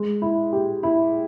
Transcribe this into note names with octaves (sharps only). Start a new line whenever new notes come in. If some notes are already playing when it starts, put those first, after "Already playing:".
Already playing: G#3
E4
G4
E4